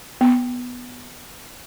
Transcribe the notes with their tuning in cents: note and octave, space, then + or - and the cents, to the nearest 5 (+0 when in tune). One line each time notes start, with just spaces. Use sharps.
B3 +0